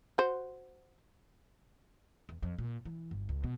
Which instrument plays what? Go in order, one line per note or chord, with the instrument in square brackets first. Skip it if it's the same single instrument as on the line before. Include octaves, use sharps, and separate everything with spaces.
[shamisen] F#4 C5
[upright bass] E2
F2
A#2
E3
G1
C#2
B2